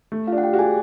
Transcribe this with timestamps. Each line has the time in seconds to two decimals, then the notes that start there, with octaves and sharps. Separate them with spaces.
0.12 A3
0.27 F4 F5
0.32 D4
0.38 F#5
0.43 G4 G5
0.53 F#4
0.59 G#4 G#5